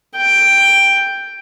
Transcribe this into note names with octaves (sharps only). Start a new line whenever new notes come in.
G5